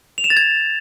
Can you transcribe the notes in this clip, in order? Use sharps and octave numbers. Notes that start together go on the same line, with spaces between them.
F7
E7
A6
G#6